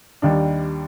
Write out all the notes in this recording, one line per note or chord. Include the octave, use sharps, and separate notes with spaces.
D#2 D#3 G3 D4